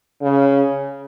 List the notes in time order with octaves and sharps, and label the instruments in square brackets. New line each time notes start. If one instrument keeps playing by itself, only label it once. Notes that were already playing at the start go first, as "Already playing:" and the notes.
[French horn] C#3